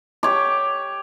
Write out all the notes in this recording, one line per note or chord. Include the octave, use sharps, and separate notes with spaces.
G4 C#5 D6